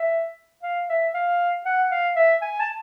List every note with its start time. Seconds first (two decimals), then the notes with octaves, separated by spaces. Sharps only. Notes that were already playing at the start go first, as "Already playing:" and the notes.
Already playing: E5
0.63 F5
0.89 E5
1.14 F5
1.65 F#5
1.91 F5
2.16 E5
2.41 G#5
2.60 A5